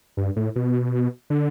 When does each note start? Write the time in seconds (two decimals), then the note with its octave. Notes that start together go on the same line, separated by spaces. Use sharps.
0.17 G2
0.36 A2
0.56 B2
1.30 D3